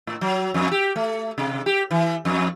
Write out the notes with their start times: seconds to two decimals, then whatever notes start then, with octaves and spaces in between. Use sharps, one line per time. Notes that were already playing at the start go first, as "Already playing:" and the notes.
0.07 A2
0.21 F#3
0.54 F2
0.71 G4
0.96 A3
1.38 C3
1.66 G4
1.91 E3
2.25 F2